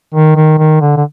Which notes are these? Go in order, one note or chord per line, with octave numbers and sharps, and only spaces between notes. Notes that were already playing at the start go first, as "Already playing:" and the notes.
D#3
D#3
D#3
D3
D3